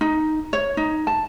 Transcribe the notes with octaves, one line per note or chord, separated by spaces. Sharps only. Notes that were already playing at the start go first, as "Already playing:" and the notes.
D#4
C#5
D#4
A5